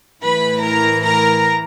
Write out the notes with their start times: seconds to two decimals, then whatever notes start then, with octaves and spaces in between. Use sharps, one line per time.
0.23 A2 E3 B4 B5
0.63 A#4 A#5
1.03 A#4 A#5